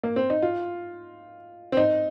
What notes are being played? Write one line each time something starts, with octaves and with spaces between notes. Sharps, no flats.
A#3
C4
D#4
F4
C4
D#4